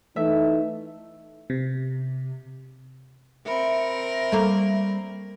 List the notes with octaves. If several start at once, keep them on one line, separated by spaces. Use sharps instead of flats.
E3 A3 D#4 E5
C3
C4 A#4 E5 B5 C#7
G3 A3 A#3 F5